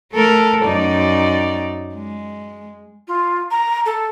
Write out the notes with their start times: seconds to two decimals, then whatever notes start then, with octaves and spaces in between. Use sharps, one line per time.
0.13 A3 A4 A#4
0.65 F#2 D#4 D5
1.95 G#3
3.08 F4
3.51 A#5
3.86 A4